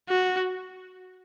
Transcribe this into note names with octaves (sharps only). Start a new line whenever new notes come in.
F#4